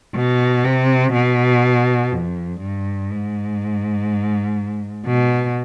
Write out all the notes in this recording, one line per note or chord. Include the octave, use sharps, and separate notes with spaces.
B2
C3
B2
F2
G2
G#2
B2